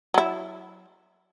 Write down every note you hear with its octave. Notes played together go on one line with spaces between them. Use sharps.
F#3 E4